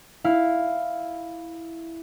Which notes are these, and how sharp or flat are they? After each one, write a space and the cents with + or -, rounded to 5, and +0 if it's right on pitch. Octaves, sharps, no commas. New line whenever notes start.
E4 +0 F5 +0